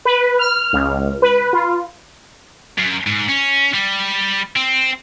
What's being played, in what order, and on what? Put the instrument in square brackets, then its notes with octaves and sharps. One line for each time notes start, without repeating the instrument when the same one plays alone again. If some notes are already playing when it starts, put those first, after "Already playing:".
[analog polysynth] B4
F6
C#2
B4
F4
[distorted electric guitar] F#2
G#2
C#4
G3
C4